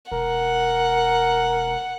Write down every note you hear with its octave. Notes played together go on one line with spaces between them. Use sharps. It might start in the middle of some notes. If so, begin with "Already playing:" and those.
E1 A#4 F#5